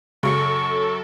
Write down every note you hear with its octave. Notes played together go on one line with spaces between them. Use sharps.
F#2 C#3 F#3 A4 C#6 C#7